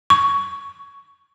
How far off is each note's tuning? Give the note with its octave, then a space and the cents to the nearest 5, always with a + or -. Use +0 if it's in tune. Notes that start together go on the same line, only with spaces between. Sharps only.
C#6 +15